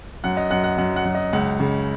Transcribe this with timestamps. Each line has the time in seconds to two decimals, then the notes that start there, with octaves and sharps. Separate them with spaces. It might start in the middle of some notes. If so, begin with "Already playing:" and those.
0.24 F#2 F#5
0.37 D#5
0.51 F#2 F#5
0.64 F#5
0.78 F#2 F#5
0.96 F#5
1.05 F#2
1.15 D#5
1.33 C#2 F#5
1.60 C#3